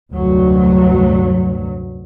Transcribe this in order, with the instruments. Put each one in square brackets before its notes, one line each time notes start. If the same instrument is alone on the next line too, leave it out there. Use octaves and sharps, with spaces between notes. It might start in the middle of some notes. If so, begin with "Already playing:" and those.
[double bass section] F1 D2 G2 F#3